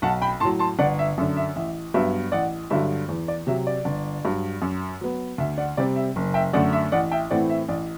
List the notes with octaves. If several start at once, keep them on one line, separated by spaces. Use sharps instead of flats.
B1 F#5 A5
G5 B5
A2 F#3 A5 C6
A5 C6
G1 D5 F#5
E5
F#2 D3 E5
E5
A1 E5
G2 F#3 B3 E5
A1 D5 F#5
G2 D3 F#3 E5
E2
D5
C3 F#3 E5
D5
G1
G2 F#3
F#2
F#3 B3
D2 E5
D5 F#5
C3 G3 C4 D5
E5
F#1
E5 G5
F#2 D3 A3 D5 F#5
E5
A1 D5 F#5
E5 G5
A2 E3 A3 C4 D5 F#5
E5
A1 D5